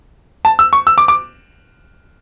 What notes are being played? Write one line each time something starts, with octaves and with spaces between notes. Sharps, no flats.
A5
E6
C#6
E6
D6
D6